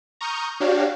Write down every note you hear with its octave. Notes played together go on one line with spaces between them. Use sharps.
A#5 C#6 D#6 F6 G6
D4 F#4 G4 C#5 F5